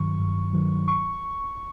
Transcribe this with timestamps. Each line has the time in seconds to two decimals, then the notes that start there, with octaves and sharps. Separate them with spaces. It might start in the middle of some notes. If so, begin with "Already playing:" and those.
Already playing: G2 D#3 F#3 C#6
0.19 G2
0.53 D#3 F#3
0.88 C#6